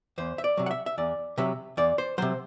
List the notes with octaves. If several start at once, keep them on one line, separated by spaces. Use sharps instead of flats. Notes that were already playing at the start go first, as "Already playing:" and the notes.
E2 C5
E5
D5
C3 F#3
F#5
E5
E5
E2 D5
C3 F#3 E5
E2 D5
C5
C3 F#3 C5